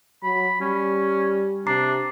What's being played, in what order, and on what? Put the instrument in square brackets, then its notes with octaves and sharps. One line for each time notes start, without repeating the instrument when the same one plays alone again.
[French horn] F#3 [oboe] B5
[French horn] G3 [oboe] C#4
[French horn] C3 [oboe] D4 [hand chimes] A#5 D6 C7